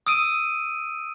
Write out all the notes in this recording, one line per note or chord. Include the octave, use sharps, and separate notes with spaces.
D#6 E6 D7 D#7